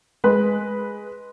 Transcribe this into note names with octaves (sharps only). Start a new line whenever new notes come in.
G#3 B4